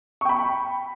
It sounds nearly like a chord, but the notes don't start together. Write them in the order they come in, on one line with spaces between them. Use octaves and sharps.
C#6 G5 B5